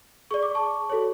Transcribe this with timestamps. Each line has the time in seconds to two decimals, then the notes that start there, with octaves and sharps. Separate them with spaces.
0.31 G#4 D5 C#6
0.43 D6
0.55 A5 C#6
0.90 F#4 A4 C#5